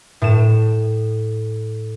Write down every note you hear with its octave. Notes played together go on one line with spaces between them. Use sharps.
A2 E7